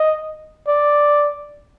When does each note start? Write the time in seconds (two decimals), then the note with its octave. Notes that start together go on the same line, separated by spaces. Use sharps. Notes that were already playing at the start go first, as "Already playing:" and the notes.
Already playing: D#5
0.68 D5